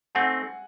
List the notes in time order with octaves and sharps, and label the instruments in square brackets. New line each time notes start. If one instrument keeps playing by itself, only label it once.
[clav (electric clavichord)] A3 C4 D#4 [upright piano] F#5 G#5